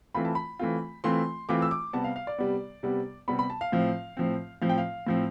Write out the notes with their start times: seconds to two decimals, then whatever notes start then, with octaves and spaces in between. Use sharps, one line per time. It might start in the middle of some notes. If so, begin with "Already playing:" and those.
0.14 E3 A3 C4 F4 B5
0.25 A5
0.35 B5
0.59 E3 A3 C4 F4
1.04 E3 A3 C4 F4 C6
1.49 E3 A3 C4 F4 D6
1.62 E6
1.71 D6
1.93 C3 G3 B3 A5
2.04 F5
2.16 F5
2.27 D5
2.38 C3 G3 B3
2.83 C3 G3 B3
3.28 C3 G3 B3 B5
3.39 B5
3.50 A5
3.61 F5
3.72 A2 F3 C4
4.17 A2 F3 C4
4.62 A2 F3 C4 F5
4.69 G5
4.78 F5
5.07 A2 F3 C4